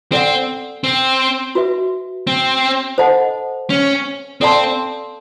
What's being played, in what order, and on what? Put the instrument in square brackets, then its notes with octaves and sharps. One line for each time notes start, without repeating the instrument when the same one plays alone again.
[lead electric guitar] C4 [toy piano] A4 D5 F#5
[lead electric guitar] C4
[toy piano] F#4 B4 E5
[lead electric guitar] C4
[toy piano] A4 C5 D#5 F#5 A5
[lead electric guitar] C#4
[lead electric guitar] C4 [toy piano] A4 D5 F5 A5 C6